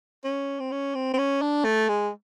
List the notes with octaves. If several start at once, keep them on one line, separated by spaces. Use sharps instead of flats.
C#4
C4
C#4
C4
C4
C#4
D4
A3
G#3